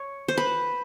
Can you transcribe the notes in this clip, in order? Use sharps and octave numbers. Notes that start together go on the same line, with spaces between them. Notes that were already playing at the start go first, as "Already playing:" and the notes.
Already playing: C#5
C5
B4